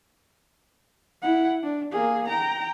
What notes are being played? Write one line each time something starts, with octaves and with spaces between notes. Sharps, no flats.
E4 F#5
D4
A#3 G#4
G5 A#5